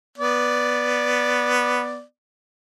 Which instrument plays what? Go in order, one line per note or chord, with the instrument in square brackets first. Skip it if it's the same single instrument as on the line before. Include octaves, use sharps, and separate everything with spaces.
[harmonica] B3 D5